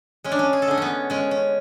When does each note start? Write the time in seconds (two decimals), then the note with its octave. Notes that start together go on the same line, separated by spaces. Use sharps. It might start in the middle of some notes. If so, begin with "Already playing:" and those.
0.24 G#3 C#4
0.32 D4
0.39 C#4
0.53 G#4
0.62 A4
0.68 D3 G#4
0.78 B3 C#4
1.10 G#3 C#4
1.31 C#4